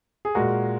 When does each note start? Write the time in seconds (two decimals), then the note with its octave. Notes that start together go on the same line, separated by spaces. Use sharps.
0.25 G#4
0.35 A#2 G#3 F#4 A#4